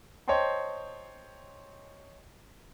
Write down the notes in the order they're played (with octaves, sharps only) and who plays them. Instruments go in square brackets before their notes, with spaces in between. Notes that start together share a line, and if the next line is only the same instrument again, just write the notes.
[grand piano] C5 C#5 D#5 G5 A5 C6